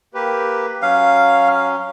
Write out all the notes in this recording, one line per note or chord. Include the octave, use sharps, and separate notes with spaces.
A#3 G4 B4
F#3 C#4 F5